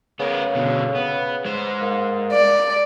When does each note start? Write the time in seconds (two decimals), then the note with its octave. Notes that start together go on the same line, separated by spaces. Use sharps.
0.20 C#3 B3 A#4
0.55 B2 D3
0.95 B3
1.45 G#3 C5
1.81 A#3
2.32 D5